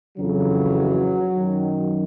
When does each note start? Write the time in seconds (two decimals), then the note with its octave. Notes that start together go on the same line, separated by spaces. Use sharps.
0.18 F2 C#3 E3 F#3
1.34 F#2 D#3